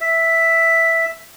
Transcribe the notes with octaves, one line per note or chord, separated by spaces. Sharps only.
E5